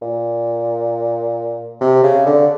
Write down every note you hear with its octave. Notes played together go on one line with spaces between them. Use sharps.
A#2
C3
C#3
D3